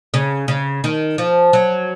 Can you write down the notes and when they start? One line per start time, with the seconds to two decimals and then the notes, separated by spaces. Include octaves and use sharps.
0.14 C#3
0.48 C#3
0.84 D#3
1.18 F3
1.53 F#3